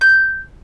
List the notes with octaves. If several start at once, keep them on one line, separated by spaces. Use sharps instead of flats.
G6